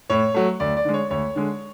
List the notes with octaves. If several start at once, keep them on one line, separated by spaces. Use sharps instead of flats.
A2 C#5
F#3 A3
D2 D5
D5
D3 G#3
C#5
D2 C#5
D3 G#3